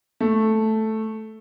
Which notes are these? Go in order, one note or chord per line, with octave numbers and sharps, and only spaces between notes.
A3